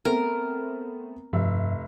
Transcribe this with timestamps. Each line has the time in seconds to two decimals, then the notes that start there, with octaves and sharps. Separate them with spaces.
0.05 A3 B3 C4 A#4
1.33 F1 G2 F3 E5